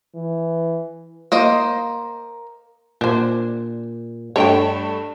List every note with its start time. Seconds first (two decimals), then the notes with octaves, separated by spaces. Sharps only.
0.15 E3
1.32 A#3 C5 D#5
3.01 A#2 D4 C5
4.36 G2 A3 C#5 D5 G5